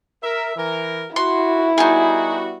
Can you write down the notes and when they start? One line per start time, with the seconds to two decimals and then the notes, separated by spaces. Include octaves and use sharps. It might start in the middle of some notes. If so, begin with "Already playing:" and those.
0.23 A#4 E5
0.57 E3 A#4
1.16 E4 F#4 C6
1.78 G3 B3 D#4 F#4 G#4